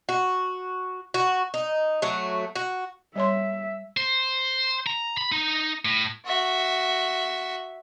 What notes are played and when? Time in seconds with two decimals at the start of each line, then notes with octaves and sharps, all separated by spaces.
0.09 F#4
1.14 F#4
1.54 D#4
2.02 F#3 A3
2.55 F#4
3.16 G3 C#5 E5 C6
3.97 C5
4.87 A#5
5.17 B5
5.32 D#4
5.85 A2
6.26 F#4 E5